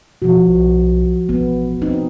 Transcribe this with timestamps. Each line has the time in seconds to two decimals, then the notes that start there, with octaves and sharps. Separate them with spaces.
0.22 B2 F3 F#4
0.48 B1
1.29 A1 B3
1.82 C4 D#4